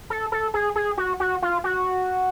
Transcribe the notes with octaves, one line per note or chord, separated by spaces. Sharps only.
A4
A4
G#4
G#4
F#4
F#4
F4
F#4